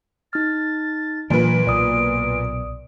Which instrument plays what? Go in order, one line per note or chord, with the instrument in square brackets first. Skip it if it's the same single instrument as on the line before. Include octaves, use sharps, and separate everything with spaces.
[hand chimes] D#4 F6 [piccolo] A6
[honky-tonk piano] A#2 B4 [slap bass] E3 F#3 D4 [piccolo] D7
[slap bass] B1 [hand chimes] D5 D#6